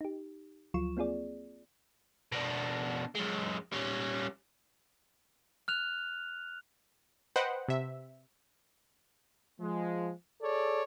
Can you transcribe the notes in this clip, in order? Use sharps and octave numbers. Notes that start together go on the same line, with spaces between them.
D#4 G4
D2 F3 F#3 F4 C#6 E7
A#3 C4 F4 G#4 D5
B2 D4
F#2 G#3
G3 C#4
F6 F#6 F7
B4 C5 D#5 F#5 G5
C3 E5
F3 G#3
G#4 A4 C#5 D5